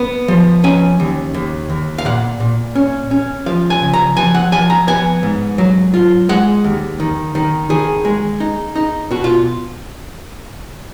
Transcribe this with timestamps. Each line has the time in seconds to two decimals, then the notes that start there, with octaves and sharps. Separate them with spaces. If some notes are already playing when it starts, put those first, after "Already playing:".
Already playing: B3
0.28 F3
0.64 C#4 G#5
1.00 D#2
1.34 D#2
1.70 D#2
1.98 F5
2.05 A#2 F#5
2.40 A#2
2.75 C#4
3.11 C#4
3.46 F3 F5
3.70 G#5
3.82 C#3
3.93 A#5
4.17 F3 G#5
4.35 F#5
4.52 F3 G#5
4.70 A#5
4.87 B3 G#5
5.23 G#2
5.58 F#3
5.94 F4
6.29 G#3 F#5
6.64 D#2
7.00 D#3
7.35 D#3
7.70 D#3 G#4
8.05 G#3
8.40 D#4
8.76 D#4
9.11 B2 F#4
9.24 F4